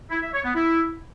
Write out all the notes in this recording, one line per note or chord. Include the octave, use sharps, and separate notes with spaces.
E4
E5
C#5
B3
E4